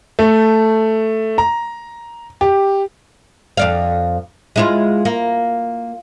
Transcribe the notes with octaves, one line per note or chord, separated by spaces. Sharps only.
A3
A#5
G4
F2 D5 F5
G#3 E4 F4
A#3